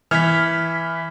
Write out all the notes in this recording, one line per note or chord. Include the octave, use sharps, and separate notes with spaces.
E3 F6 G#6 B6